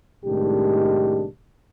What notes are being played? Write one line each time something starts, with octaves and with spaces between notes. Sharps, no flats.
C2 A2 D#3 G#3 D4 G4